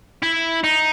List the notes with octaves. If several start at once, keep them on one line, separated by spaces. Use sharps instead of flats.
E4
D#4